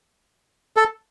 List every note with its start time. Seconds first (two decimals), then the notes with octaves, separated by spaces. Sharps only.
0.77 A4